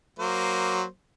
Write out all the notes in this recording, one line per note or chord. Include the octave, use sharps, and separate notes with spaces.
F#3 A#3 C5